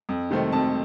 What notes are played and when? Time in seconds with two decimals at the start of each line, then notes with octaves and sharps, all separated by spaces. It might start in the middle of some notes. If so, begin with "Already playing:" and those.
0.09 F2
0.31 C3 D#3 A3 C4
0.52 F2 A5